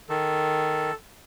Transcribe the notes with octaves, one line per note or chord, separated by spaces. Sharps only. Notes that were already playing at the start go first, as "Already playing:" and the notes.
D#3 A4